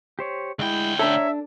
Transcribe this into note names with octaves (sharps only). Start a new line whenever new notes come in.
G4 C5 C#5
D2 G#3 E4 G5
D4 A4 C#5 E5 A#5